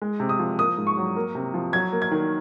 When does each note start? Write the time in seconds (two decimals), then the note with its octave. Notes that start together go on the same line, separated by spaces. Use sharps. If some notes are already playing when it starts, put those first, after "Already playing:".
0.02 G#3
0.20 C3
0.29 D#6
0.39 F3
0.59 A#3 D#6
0.77 G#2
0.87 C#6
0.97 F#3
1.16 A#3
1.35 C3
1.54 F3
1.73 F#3 G#6
1.92 A#3
2.02 G#6
2.11 D#3